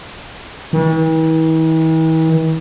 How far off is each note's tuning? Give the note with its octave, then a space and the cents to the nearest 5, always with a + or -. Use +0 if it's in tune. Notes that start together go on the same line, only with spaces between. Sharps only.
E3 -45